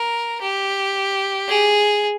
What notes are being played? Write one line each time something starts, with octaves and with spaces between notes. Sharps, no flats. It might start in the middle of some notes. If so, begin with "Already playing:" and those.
Already playing: A#4
G4
G#4